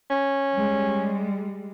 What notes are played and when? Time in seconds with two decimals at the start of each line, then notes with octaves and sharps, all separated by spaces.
0.10 C#4
0.54 G3 G#3